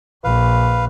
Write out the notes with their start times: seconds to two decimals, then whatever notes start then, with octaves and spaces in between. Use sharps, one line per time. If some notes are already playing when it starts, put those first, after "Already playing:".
0.24 A#1 B4 F5